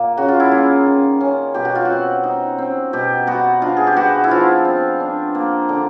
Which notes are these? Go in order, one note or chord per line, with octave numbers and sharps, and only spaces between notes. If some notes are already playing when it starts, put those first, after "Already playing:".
Already playing: A#2 A#3
C#3 F#4
F4
E4
A#3 F4
D#3
C#4
B2 G4
F#4
F4
C4 F#4
D#4
C4
B2 G4
B3 F#4
D4 F4
G#4
G4
B3 F#4
E4
F3 F4
C4
D4
A#3
D3